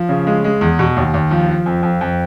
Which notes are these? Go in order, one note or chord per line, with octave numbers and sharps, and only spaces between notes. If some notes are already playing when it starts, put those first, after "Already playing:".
Already playing: F3
C#3
G#3
G#3
E2
B2
D#2
D#2
F3
F3
F2
F2
F2